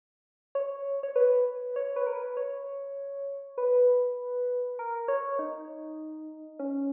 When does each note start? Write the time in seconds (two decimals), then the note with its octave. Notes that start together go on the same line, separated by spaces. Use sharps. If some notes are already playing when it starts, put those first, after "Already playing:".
0.55 C#5
1.03 C#5
1.16 B4
1.76 C#5
1.96 B4
2.07 A#4
2.16 B4
2.37 C#5
3.58 B4
4.79 A#4
5.08 C#5
5.39 D#4
6.59 C#4